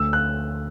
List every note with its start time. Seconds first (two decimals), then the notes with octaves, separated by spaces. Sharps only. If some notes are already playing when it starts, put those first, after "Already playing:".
Already playing: D2 E6
0.13 F#6